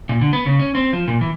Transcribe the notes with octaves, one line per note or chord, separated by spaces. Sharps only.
A#2
D3
B3
C#3
C#4
C4
F3
A#2
E3